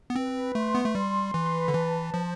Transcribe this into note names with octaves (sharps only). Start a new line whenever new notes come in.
B3
C4 B4
A3 C6
B3
A3
G3 C6
E3 B4
D3
E3 A5
F3 C5